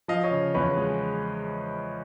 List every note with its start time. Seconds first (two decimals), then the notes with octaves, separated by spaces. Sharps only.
0.08 F3 D#5 F5
0.24 C#5 D#5
0.31 C#3
0.54 E2 B4 C#5
0.77 G#3